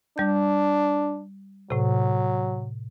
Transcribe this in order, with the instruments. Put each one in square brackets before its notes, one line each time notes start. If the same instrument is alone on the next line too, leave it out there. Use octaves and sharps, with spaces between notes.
[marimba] G3 G6 [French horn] D4
[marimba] A2 C3 [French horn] F#3